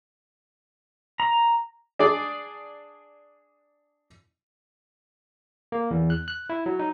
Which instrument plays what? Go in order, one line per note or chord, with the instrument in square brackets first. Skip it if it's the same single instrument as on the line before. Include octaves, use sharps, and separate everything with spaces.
[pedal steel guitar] A#5
[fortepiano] D4 G#4 D5
[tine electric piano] A#3
E2
F#6
F#6
E4
F#3
D#4